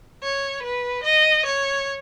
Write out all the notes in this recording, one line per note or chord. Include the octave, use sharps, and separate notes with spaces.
C#5
B4
D#5
C#5